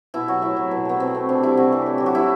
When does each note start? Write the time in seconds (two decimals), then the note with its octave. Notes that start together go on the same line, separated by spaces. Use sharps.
0.14 B2 E4
0.28 F#3 F#4
0.42 A2 E4
0.57 F#3
0.71 B2
0.85 A3 B3
1.00 B2 C4
1.15 A3
1.29 C3 D4
1.43 G3 E4
1.57 C3 F#4
1.72 E3
1.86 A2
1.98 F#3 G4
2.06 F#4
2.15 C3 E4